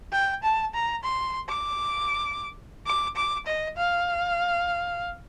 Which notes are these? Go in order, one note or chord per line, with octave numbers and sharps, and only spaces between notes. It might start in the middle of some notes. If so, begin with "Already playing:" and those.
G5
A5
A#5
C6
D6
D6
D6
D#5
F5